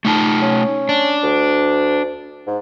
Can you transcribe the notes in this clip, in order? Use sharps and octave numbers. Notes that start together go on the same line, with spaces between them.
A3 D#4 A5
C#4
D4
D2
G#2